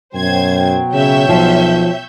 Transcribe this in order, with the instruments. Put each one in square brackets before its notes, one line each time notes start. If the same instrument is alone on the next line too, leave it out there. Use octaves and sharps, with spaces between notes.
[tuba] F#2 [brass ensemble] B2 F#3 G5 [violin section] C5 G#6
[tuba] C#3 [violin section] C#5 E5 G6
[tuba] B1 [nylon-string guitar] F3